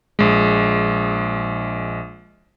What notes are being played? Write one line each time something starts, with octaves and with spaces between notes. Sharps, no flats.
A#1 G#3